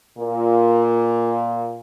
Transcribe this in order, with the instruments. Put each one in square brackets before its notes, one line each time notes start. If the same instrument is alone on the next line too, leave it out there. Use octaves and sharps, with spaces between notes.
[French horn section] A#2